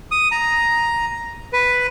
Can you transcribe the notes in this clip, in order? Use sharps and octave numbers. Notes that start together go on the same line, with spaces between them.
D#6
A#5
B4